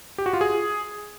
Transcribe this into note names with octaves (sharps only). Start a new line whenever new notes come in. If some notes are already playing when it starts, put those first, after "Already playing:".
G4
F#4
F4
G#4